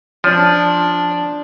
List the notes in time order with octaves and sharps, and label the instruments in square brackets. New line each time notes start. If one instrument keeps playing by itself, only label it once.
[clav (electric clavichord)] F3 [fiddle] D4